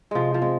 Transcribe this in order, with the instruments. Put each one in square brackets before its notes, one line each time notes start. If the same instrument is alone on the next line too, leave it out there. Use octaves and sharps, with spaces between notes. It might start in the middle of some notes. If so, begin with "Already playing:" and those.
[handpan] C3 [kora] F3 G#3
[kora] F3
[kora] G#3 [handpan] C4